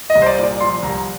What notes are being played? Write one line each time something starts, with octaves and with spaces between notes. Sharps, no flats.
D#5
C2
C5
D5
A#2 D5
F3 C6
C2 A#5